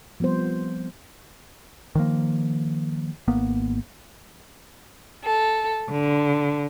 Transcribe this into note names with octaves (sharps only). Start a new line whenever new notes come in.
F3 G3 B3 C4 C5
D#3 F3 A#3
G#1 A#3 B3
A4
D3